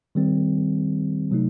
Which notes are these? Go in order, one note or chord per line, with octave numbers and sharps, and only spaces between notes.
D#3 G3 C4
C3 F#3 A3 D#4